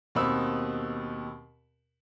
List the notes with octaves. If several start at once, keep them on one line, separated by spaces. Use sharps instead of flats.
D#2 B2 B3 C4 B5 E6